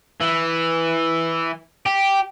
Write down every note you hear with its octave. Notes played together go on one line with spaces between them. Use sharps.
E3
G4